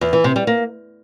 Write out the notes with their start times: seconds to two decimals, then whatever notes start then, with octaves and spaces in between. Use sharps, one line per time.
0.01 E2
0.13 E3
0.24 C3
0.36 G3
0.47 A#3